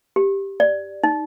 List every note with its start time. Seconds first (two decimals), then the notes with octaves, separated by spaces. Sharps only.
0.16 G4
0.60 D5
1.04 D#4